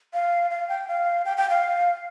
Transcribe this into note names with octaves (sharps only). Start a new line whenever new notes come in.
F5
F5
G5
F5
G5
G5
F5